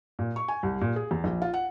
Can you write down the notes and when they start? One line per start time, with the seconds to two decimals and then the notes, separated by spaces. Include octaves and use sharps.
0.19 A#2
0.36 C#6
0.48 G#5
0.63 C2
0.81 A#2
0.96 G#4
1.11 E2
1.24 A#1
1.42 F4
1.54 F#5